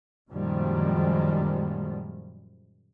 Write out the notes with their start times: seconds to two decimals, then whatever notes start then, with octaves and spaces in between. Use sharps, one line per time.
0.31 F#2 A#2 D#3 F3 G3 G#3